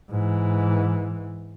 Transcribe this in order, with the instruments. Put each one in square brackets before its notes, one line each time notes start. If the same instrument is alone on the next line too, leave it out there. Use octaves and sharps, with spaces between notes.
[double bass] G#2 E3